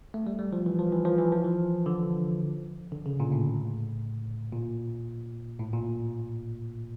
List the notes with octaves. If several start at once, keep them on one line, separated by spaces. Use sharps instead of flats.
A3
G3
G3
F3
E3
F3
E3
F3
E3
F3
E3
D3
D3
C#3
A#2
A2
A#2
A2
A#2